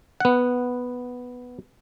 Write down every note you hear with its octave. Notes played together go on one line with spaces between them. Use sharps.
B3 F#5